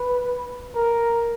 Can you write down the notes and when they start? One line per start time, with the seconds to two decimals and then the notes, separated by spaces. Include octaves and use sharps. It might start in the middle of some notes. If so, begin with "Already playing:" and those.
Already playing: B4
0.75 A#4